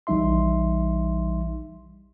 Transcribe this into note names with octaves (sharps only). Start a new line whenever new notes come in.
A#1 E3 G3 D#4 E5 C6